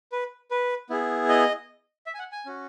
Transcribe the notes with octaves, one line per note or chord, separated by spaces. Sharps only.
B4
B4
B3 E4 G#4
D#5
E5
G#5
F#5
G#5
C#4 F#4